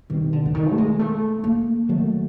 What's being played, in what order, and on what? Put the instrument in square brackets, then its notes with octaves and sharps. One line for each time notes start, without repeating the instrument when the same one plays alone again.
[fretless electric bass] B2 G3 C4 [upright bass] D#3
[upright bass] D3
D3
D#3
A3
G#3
A3
A#3
[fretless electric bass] D#3 F#3 A3